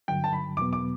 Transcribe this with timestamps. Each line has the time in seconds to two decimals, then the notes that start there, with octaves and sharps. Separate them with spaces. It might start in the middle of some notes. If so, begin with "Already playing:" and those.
0.08 G2 D3 F#3 G5
0.24 A5
0.33 B5
0.57 E2 B2 F#3 B3 D6
0.73 D6